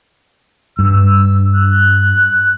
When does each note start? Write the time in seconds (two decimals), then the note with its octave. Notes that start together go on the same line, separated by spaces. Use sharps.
0.79 G2 E6
1.56 F#6